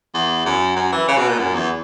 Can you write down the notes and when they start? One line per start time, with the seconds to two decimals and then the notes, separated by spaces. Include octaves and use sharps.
0.14 E2
0.46 F#2
0.77 F#2
0.92 E3
1.08 C#3
1.18 B2
1.29 A#2
1.39 F#2
1.55 E2